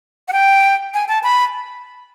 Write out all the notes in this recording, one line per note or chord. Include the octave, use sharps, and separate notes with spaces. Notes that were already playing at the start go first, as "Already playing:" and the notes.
F#5
G5
G#5
A5
B5